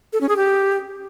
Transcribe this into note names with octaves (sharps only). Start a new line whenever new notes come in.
A4
C#4
G#4
G4